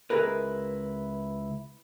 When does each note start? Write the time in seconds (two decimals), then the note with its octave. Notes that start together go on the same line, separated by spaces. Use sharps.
0.10 C#2 E4 G#4 A#4 B4